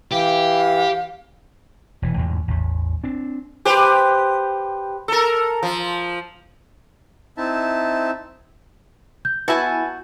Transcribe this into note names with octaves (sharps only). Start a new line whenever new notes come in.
E3 G4 F5
E1 E3
A1 E2 G#2
A1 E2
C4 D4
G4 B4 C5
A4 A#4
F3
C4 D#4 E4 E5 A5
G6
B3 E4 F#4 G#5 A5